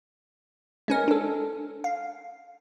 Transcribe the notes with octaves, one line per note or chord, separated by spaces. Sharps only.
G#3 C#4 A#4
D4 A4
F5